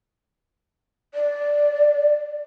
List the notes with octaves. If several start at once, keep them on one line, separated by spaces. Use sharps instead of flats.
D5